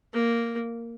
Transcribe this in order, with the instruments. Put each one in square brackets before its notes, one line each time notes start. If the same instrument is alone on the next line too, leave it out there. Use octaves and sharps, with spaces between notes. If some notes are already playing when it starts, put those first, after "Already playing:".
[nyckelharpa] A#3